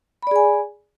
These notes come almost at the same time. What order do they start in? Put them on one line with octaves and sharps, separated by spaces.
B5 D5 G#4 G#5